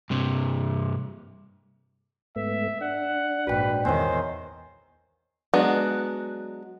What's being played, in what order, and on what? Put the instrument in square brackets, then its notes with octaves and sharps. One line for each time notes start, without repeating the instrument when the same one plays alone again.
[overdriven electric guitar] G2 C3
[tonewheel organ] G#2 A3 B3 [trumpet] E5
[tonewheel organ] D4 [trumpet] F#5
[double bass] A#1 G#2 [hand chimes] F#4 G5 [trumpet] B4
[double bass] E2 D#3 [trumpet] C5 [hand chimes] C#5 G#5
[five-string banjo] F#3 G#3 B3 D4 F#4